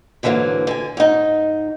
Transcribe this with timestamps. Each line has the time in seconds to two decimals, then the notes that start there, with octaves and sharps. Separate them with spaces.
0.23 G#2 D3 E3 F#3 A#3
0.67 D3 G#5
0.97 G#2 D#4